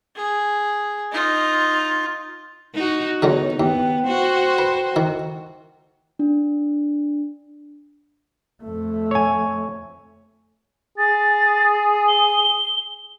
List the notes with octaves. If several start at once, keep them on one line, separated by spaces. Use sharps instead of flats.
G#4
D#4 F4
D#4 F#4
D3 F#3 G#3 B3 D#4 C#5
D#2 B3 G5
F#4 C5
B4
D#3
D4
F2 A3
C#5 G#5
G#4 A6
G7